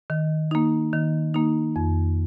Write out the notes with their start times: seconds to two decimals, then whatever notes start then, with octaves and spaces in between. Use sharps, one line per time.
0.10 D#3
0.51 A#3 D#4
0.93 D#3
1.34 A#3 D#4
1.76 F2